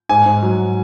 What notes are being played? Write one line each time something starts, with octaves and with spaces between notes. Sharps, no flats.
G#2 G#5
G#2
F#3